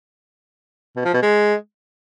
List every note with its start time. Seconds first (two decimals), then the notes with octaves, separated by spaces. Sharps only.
0.96 B2
1.05 F3
1.14 B2
1.22 G#3